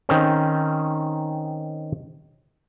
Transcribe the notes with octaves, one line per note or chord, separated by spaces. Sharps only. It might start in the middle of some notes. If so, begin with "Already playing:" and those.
D#3 C4 C#4